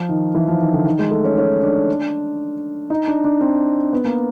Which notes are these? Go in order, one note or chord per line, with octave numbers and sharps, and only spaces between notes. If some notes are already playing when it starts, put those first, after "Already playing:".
Already playing: F3
D#3
E3
F3
D#3
D3
D#3
G#3
A3
C#4
C#4
D4
D#4
D4
D4
C4
B3
A#3